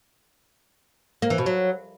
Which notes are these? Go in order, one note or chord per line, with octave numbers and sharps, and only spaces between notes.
A#3
E3
B2
F#3